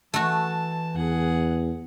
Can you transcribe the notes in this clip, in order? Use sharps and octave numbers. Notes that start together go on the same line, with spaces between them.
E3 A3 F#4 A5
E2 G#4 F#5